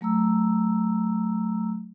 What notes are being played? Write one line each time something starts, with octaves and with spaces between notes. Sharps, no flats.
F#3 A3 A#5 E6